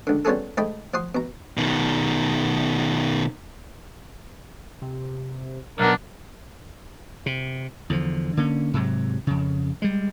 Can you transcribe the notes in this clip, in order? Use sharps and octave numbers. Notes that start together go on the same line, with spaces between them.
C#2 D3
G3 B3 C#4 F4 G#4 A4
G#2 A3 D#5 G5 B5
F3 F#5 C6 D#6
B2 A#5
B2 D#3
C3
B1 B3 D4 A#4
C3
E2 D3 F3
D3 A#3 C#4
G#2 C3 F#3
F2 C#3
G3 G#3